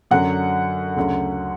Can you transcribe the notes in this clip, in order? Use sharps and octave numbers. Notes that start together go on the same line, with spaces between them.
F#2 D3 F#3 F#5
D2 C#3 F#3